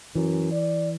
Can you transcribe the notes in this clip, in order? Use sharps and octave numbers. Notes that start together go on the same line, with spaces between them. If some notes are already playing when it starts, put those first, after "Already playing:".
F#2 E3
D5